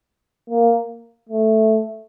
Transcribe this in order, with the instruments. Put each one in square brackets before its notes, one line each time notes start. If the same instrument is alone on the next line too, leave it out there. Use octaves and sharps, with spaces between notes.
[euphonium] A#3
A3